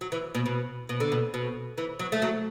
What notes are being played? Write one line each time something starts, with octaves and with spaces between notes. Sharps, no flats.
F#3
E3
B2
B2
B2
D3
B2
B2
E3
F#3
A3
F#3